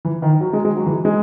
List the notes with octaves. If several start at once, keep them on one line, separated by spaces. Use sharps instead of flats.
E3
D#3
F#3
G#3
G#3
F#3
E3
G#3